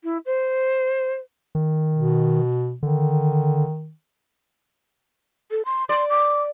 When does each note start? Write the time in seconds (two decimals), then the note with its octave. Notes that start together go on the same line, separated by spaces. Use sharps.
0.04 E4
0.25 C5
1.55 D#3
1.96 B2
2.83 D3 D#3
5.51 A4
5.66 C6
5.89 D5 C6
6.10 D6